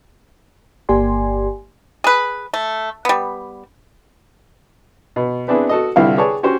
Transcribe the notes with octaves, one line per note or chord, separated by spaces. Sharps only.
G1 A#3 G4 D5 G#5 C6
G#4 B4
A3
G3 B3
B2
B3 C4 D4 E4 G#4 B4
F#4 A4 D#5
C2 D3 C4 E4 F4 F5
G#4 B4 C#5 D5 A5
C#4 F#4 G4 C5